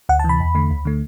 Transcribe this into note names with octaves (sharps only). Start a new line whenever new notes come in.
D2 F#5
A5
C3 E3 B5
E2
D3 A3
D2
D3 A3